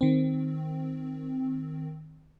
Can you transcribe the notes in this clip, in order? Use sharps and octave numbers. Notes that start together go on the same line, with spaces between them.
D#3 C4